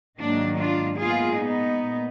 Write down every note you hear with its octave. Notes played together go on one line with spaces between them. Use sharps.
G#2 D#3 F#3 A#3 D4
D4 F4
A#2 G#3 B3 F4 G#4
B3 D#4
A#2